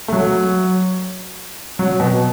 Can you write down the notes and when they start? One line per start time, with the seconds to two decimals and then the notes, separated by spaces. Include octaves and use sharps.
0.08 A3
0.13 F#3
1.79 F#3
2.00 B2